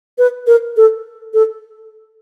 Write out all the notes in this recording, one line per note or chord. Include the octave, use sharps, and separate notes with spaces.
B4
A#4
A4
A4